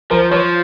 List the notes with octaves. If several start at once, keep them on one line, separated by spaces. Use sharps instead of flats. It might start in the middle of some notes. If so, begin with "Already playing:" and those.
F3 A#4 C5
F3 B4 C#5